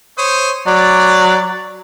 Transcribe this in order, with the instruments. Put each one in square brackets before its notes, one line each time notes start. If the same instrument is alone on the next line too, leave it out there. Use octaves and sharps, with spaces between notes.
[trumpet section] C5 C#5 D#6
[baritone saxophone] F#3 [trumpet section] D5